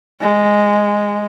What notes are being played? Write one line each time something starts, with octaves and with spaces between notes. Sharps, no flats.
G#3